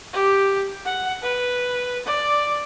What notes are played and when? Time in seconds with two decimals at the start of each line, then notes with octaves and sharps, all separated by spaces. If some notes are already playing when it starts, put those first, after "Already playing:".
0.13 G4
0.85 F#5
1.22 B4
2.06 D5